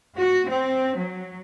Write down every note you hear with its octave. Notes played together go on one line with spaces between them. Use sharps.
F#4
C4
F#3